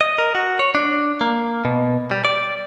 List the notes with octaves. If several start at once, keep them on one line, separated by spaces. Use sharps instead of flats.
D#5
A#4
F#4
C#5
D4
A#3
B2
G3
D5